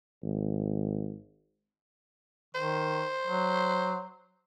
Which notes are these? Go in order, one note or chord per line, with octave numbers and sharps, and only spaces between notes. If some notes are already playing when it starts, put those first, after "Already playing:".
G#1
D#3 C5
F#3